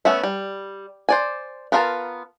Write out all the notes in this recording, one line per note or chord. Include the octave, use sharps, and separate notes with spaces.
A3 B3 C#4 E5
G3
C5 D5 G#5
B3 F4 A#4 F5 A5